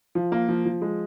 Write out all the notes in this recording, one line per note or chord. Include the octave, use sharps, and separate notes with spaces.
F3
A#3
F3
F3
G#3